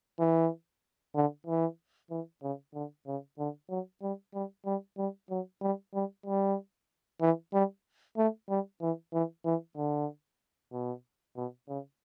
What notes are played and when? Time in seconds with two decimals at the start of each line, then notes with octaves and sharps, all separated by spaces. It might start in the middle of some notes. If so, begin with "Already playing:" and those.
0.19 E3
1.15 D3
1.47 E3
2.11 E3
2.43 C#3
2.74 D3
3.07 C#3
3.39 D3
3.70 F#3
4.02 G3
4.34 G3
4.66 G3
4.98 G3
5.30 F#3
5.62 G3
5.94 G3
6.26 G3
7.21 E3
7.54 G3
8.17 A3
8.49 G3
8.81 E3
9.13 E3
9.45 E3
9.77 D3
10.73 B2
11.36 B2
11.69 C#3